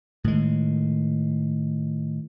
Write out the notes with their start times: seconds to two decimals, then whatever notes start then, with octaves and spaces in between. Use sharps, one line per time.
0.24 A2 D#3 G#3